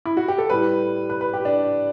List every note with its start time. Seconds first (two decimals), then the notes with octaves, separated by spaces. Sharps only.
0.05 E4
0.17 F#4
0.28 G4
0.38 A4
0.50 A2 G3 B4
1.10 B4
1.21 B4
1.33 G4
1.45 D4